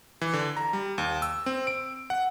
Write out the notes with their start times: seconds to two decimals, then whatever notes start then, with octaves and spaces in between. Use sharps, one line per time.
0.21 E3
0.33 D3
0.57 A#5
0.73 G3
0.98 D#2
1.22 E6
1.46 C4
1.67 D7
2.10 F#5